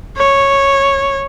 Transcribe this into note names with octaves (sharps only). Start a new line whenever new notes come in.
C#5